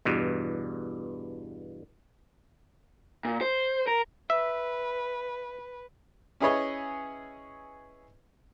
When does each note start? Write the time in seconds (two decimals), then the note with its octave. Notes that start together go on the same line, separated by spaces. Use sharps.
0.05 E2 G2 B2
3.25 A#2
3.41 C5
3.87 A#4
4.30 B4 E5
6.40 C#4 E4 G#4 B4 C#5 D#5